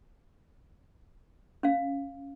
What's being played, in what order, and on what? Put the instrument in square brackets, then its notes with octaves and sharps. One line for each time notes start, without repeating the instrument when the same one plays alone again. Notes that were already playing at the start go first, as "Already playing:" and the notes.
[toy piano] C#4 F5